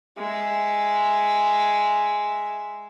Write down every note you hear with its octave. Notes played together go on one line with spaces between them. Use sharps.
G#3 E5